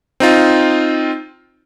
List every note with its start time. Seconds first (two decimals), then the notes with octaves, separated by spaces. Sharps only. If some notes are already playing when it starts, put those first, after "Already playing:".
0.20 C4 D#4 F4